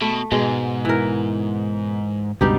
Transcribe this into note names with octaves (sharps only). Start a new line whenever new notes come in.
B2 A3
G#2 B2 G#3
E3 A#4
C#2 G2 B2 G3 D#4 G4